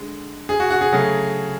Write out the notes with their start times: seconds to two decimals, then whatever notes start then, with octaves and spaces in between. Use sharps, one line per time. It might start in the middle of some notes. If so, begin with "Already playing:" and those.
Already playing: D3 G#3
0.49 G#4
0.60 F#4
0.70 F#4
0.81 G#4
0.92 C#3 F#3 A3